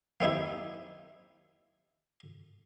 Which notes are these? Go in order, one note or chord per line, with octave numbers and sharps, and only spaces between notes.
A#3 C4 D#4 E4 G4